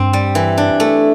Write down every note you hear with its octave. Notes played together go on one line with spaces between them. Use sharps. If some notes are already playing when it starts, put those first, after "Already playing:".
Already playing: G2 C4
G3
E3
D4
A3